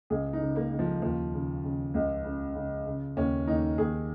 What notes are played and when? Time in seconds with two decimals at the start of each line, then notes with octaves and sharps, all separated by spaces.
0.10 C#2 G#4
0.33 D#4
0.41 C#3
0.56 A#3
0.72 C#3
0.79 F3
1.02 D#2 F3
1.33 C#3
1.63 C#3
1.94 C#2
2.24 C#3
2.55 C#3
2.86 C#3
3.16 D#2 C#4
3.47 D#2 D#4
3.78 D#2 G#4